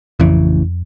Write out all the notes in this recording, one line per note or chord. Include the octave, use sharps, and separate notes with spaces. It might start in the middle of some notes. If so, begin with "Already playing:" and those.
A1 F2 C#3 E3